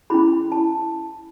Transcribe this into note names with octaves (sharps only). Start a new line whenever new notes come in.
C#4 E4 G#4 B5
A5